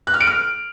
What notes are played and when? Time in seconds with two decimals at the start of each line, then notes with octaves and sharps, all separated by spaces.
0.07 F#6
0.14 F6
0.20 D7
0.27 F6